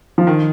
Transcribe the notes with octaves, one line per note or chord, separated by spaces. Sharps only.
F3
D#3